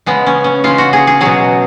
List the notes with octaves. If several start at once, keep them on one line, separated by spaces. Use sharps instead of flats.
C#3 G#3 B3
C#4
C#4
C#3 G#3 F4
F#4
G#4
G#4
B2 F#3 G#4